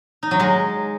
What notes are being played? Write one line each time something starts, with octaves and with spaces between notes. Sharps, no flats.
D#4
F#3
G#3